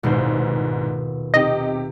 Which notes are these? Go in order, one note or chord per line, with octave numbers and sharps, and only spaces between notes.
D#1 C2 G#2 B2 C5
C3 D#4 G4 D#5